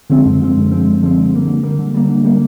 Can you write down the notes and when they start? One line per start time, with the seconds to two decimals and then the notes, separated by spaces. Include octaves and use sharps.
0.10 D3 F3 G#3 C4
0.26 F#2
0.40 D3 F3 G#3 C4
0.56 F#2
0.71 D3 F3 G#3 C4
0.87 F#2
1.01 D3 F3 G#3 C4
1.18 D3
1.33 G3 A#3
1.48 D3
1.63 G3 A#3
1.79 D3
1.94 G3 A#3
2.09 D3
2.24 G3 A#3